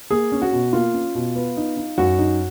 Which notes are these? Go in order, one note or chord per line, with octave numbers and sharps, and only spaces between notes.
A#3 G#4
C#4
F#4
B2
A#3 F4
C#4
B2
B3
D#4
D#4
F#2 F#4
D#4